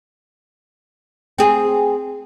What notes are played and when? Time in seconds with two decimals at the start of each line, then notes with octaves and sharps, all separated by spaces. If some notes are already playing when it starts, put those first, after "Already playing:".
1.38 C4 G#4